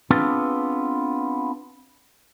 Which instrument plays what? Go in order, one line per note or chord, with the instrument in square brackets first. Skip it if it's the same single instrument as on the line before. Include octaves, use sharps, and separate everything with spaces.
[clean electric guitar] B3 C4 D4 F4 G#4 B4